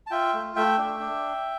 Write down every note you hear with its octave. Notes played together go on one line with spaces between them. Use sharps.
A5
F4 E5 G5
A3
A3 E5 G5
D4
D4